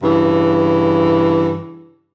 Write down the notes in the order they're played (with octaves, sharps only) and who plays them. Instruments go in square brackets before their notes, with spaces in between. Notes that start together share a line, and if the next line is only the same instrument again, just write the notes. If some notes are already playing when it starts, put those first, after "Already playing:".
[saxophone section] G2 C#3 E3